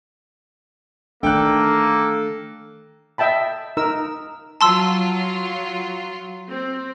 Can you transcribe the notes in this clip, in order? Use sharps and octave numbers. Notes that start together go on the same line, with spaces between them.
D#3 A3 A#3 D4 A4 G5 F#6
D#5 E5 G5 A5 B5
D#4 A#4 E6
F#3 F4 A5 C6 E6
C4